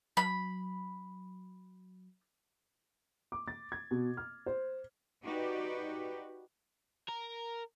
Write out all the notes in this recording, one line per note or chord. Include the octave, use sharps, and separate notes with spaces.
F#3 B5
D6
A6
G#6
B2
F6
C5
D#4 F#4 G4 B4 D5
A#4